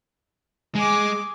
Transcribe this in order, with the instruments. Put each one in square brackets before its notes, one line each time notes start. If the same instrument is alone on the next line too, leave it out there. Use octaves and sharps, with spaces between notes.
[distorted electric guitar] G#3 [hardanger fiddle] G#5 D6